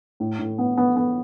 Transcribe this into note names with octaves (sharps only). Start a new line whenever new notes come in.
A2
A2
B3
B3
B3